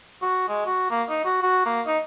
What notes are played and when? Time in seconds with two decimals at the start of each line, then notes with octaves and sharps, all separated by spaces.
0.22 F#4
0.48 G#3
0.66 F#4
0.91 A#3
1.09 D#4
1.25 F#4
1.43 F#4
1.66 A#3
1.87 D#4